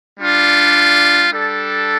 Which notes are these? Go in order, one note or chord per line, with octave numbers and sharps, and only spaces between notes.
G3 D4 F4
G3 D4 A4